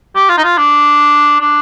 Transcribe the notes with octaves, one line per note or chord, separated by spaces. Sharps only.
G4
F4
D#4
F4
D4
D4